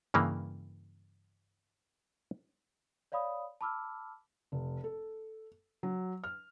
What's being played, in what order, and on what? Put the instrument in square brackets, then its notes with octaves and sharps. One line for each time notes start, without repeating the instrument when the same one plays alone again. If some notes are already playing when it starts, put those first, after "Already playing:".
[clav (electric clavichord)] G2 C#3 E3 A#3
[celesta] C#5 D5 F5 B5 D#6
A5 B5 D6 E6 F6
[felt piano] F1
A4
F#3
F6